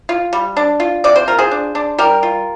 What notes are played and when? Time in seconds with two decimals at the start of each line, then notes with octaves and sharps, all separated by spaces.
0.09 F4
0.33 G3
0.57 D4
0.80 F4
1.04 C3 D5
1.16 C5
1.28 F4 A#4
1.39 G#4 C5
1.51 D4
1.75 D4
1.98 G3 G4 A#4
2.23 F4